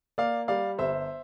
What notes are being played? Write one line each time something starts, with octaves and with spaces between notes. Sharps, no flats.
A#3 D5 F5
G3 D5 F5
G1 C5 E5